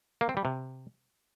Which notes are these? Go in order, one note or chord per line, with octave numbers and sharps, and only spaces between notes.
A#3
C4
G3
C3